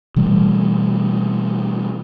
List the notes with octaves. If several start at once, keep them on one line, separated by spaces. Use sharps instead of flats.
B2 E3 G3 A3